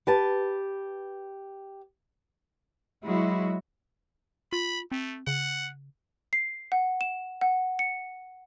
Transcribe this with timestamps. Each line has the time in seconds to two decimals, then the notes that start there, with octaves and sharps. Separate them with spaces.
0.07 G4 B4 A5
3.04 F#3 G#3 E4 F#4
4.53 F4 B5
4.92 A3 C4
5.27 C#3 F#5
6.33 C7
6.72 F#5
7.01 E7
7.41 F#5
7.79 C#7